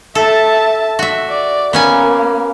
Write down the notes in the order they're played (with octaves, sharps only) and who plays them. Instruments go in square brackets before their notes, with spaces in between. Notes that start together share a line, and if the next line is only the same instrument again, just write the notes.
[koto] A4 [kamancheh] E5 A5
[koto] F#4 E5
[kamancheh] D5
[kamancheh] A#3 [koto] B3 C#4 G#5